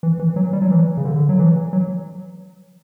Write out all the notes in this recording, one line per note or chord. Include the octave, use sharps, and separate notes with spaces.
E3
E3
F#3
G3
F#3
E3
C#3
D3
F#3
E3
F#3